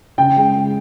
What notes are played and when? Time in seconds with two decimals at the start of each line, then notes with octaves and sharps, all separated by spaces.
0.18 C#3 G5
0.36 G#3
0.55 G#3